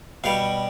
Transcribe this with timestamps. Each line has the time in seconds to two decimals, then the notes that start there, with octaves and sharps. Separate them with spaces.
0.24 B2 G3 F5